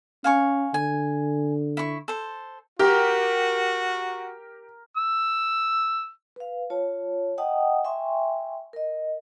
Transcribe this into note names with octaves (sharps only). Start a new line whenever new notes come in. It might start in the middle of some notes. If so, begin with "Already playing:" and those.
C#4 F5 G#5 C#6
D3 G#5
E4 C#6
A4 C5
F#4 G4 A#4
E6
B4 F5
F4 C#5 A5
D#5 F#5 G5 A5 D#6
E5 G5 G#5 C6 C#6
A#4 D#5